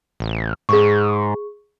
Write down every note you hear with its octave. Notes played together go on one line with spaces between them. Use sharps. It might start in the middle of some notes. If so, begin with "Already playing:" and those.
A1
G#2 G#4 C#6